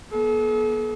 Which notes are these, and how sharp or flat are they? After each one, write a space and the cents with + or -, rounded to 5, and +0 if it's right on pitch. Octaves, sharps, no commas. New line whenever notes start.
B3 -45 A4 -45